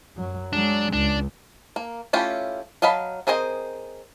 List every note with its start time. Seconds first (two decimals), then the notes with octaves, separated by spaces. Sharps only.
0.15 F#2 F#3
0.53 F#3 G#3 D4
0.93 C#2 D4
1.76 A#3
2.13 A3 C#4 E4 F4 G4
2.82 F#3 D#5 F5 A5 B5
3.27 C4 G#4 A#4 C5 D#5